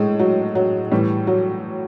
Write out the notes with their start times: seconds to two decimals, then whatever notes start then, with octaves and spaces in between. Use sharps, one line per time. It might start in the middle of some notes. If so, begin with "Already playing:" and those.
Already playing: A2 G#3
0.19 F#3
0.55 F#3
0.91 A2 E3 G3
1.27 F#3